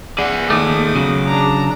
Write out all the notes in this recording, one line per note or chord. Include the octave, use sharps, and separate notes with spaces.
G#4 D5 F#5
D#2 A3 D6 D#6
C#3 F#3
D4 A#5